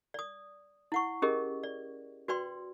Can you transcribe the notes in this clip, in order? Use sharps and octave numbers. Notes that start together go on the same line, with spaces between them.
D5 D#6
E4 F#5 C#6
C#4 G4 G#4 A#4 D#5
D5
F#4 B4 D5 G5 C6